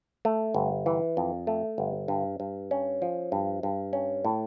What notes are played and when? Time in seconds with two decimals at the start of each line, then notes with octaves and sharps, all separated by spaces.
0.25 A3
0.54 G1
0.86 E3
1.17 F2
1.47 A3
1.78 G1
2.08 G2
2.40 G2
2.71 C#4
3.02 F3
3.32 G2
3.63 G2
3.93 C#4
4.25 A2